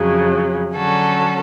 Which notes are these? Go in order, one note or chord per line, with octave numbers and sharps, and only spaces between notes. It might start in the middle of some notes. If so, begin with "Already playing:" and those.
Already playing: F2 C#3 F#3
D3 F#3 C#4 F#4 A4